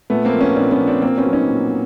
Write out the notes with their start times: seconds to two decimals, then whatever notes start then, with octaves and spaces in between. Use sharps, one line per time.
0.10 A#2 A3 B3
0.25 A#3 C4
0.33 F3
0.41 B3 C#4
0.56 A#2 C4 D4
0.71 B3 C#4
0.80 F3
0.87 C4 D4
1.02 A#2 A#3 C4
1.18 B3 C#4
1.26 F#3
1.33 C#4 D#4
1.49 A#2